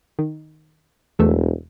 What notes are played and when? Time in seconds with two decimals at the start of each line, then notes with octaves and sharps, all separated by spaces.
0.19 D#3
1.19 E1 E2 A3 E5